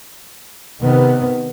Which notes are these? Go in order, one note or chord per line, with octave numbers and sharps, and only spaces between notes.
C3 D#3 B3